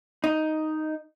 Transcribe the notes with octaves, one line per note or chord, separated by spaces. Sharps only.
D#4